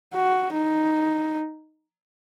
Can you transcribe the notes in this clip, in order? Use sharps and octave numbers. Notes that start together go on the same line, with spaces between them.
F#4
D#4